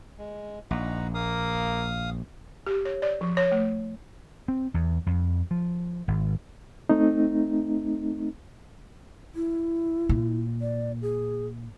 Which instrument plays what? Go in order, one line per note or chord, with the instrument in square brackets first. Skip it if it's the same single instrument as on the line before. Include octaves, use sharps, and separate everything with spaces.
[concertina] G#3
[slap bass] A#1 [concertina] D#4 F#5 A#5
[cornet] A#3 [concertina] F5 D#6
[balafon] G4
C#5
D5
F3
C#5
A3
[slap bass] C4
E2
F2
F3
G#1
[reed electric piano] A3 C4 D#4
[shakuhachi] E4
[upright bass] A#2
[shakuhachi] D5
G#4